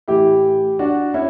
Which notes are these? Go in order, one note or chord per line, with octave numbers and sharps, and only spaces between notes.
A2 E3 E4 G4
D4 F#4
C#4 E4